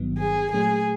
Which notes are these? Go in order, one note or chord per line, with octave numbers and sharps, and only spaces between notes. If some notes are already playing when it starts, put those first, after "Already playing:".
Already playing: G1 G2 D#3 F#3 B3
G#4
A#2 F#3 A3 C#4 G#4